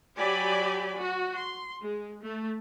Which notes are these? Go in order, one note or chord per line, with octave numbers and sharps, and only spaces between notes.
F#3 G4 D5 G#5 B5
F#4
C6
G#3
A3